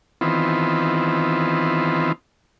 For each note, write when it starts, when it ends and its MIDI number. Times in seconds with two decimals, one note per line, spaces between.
0.21 2.12 51
0.21 2.12 52
0.21 2.12 59
0.21 2.12 60
0.21 2.12 65